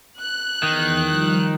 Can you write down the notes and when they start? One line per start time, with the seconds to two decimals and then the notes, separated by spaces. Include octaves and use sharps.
0.21 F#6
0.63 E2 D#3
1.07 F3 G3 D#4